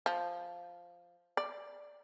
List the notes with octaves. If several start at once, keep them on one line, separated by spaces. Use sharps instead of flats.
F3
D5